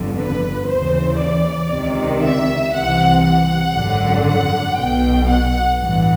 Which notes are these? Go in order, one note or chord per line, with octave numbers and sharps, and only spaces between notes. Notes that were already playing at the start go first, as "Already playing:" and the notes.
Already playing: G1 F2 D3
B4
D#2 C#3 E3 C5
D5
C#2 C3 D#3
E5
C2 C3 E3 F#5
F#5
G#1 F#2 D3
F#5
B1 B2 G5
F#5
A1 G2 E3 F#5